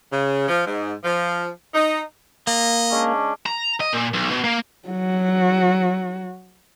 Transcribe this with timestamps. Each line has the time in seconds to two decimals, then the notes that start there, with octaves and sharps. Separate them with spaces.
0.13 C#3
0.48 F3
0.67 G#2
1.05 F3
1.75 D#4
2.47 A#3 D#5
2.91 G#3 C#4 D4
3.46 A#5
3.80 D#5
3.93 A#2
4.13 B1
4.31 B2
4.44 A#3
4.88 F#3 F#4